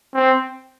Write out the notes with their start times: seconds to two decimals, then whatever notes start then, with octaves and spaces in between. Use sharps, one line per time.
0.14 C4